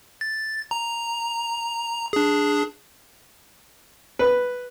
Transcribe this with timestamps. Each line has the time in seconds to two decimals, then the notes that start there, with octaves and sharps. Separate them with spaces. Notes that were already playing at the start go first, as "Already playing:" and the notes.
0.21 A6
0.71 A#5
2.13 D4 G#4
4.19 B4